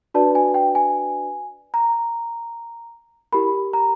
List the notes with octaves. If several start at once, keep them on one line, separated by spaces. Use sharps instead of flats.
D4 F#4 B4 D5 A5
G#5
G5
G#5
A#5
E4 G4 A#4 B5
A#5